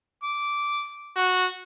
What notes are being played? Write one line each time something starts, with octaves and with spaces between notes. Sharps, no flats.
D6
F#4